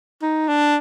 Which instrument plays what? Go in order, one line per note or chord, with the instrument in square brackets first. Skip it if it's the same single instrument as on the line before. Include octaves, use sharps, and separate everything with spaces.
[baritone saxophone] D#4
D4